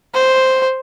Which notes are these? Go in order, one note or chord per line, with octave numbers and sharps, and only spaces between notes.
C5